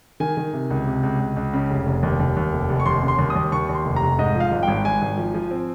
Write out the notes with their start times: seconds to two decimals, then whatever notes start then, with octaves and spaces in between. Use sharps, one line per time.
0.20 D#3 G#5
0.37 D#3
0.53 C3
0.70 C#2
0.87 C3
1.03 C#2
1.20 C#2
1.37 C#2
1.53 C#3
1.70 F1
1.86 F1
2.03 D#2
2.20 D#2
2.37 D#2
2.53 F1
2.70 F1
2.80 C#6
2.86 D#2 C6
3.03 C#3
3.08 C6
3.19 D#2
3.30 D#6
3.36 D#2
3.52 D#2 C#6
3.69 D#2
3.74 C6
3.85 F1
3.96 A#5
4.03 F1
4.18 G#2 D#5
4.36 F3 F5
4.52 G#1
4.63 G5
4.68 G#1
4.85 G#1 G#5
5.02 G#1
5.18 F3
5.34 F3
5.51 C4